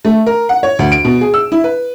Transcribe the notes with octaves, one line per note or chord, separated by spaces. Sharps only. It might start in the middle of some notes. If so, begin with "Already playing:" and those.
A3
A#4
F#5
C#5
D2
D7
B2
G#4
E6
E4
B4